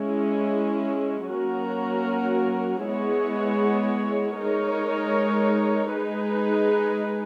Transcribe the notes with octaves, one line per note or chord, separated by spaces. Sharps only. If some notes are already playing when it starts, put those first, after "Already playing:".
Already playing: G#3 C#4 E4
F#3 A#3 C#4 F#4 A#4
G#3 B3 E4 G#4 C#5
G#3 D#4 A#4 C#5
G#3 D#4 G#4 B4